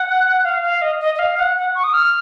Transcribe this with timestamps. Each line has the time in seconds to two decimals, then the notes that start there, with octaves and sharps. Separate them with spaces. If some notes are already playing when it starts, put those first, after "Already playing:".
Already playing: F#5
0.45 F5
0.63 F5
0.82 D#5
1.01 D#5
1.15 D#5
1.19 F5
1.38 F#5
1.56 F#5
1.75 C#6
1.84 D#6
1.94 F6